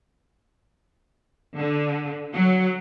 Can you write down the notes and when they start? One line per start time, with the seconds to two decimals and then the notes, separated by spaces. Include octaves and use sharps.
1.55 D3
2.34 F#3